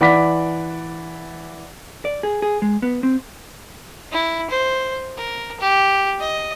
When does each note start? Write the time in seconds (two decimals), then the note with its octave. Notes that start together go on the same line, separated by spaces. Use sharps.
0.01 E3 D5 F#5 B5 D6 B6
2.05 D5
2.23 G#4
2.42 G#4
2.62 G#3
2.82 B3
3.03 C4
4.12 E4
4.50 C5
5.17 A#4
5.60 G4
6.20 D#5